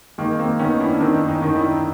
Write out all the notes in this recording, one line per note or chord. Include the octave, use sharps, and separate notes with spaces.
D#3 G#3 A#3
A#3 C4
D#3 B3 C#4
D4 E4
D#3 C4 D4
C#4 D#4
D#3
D4 E4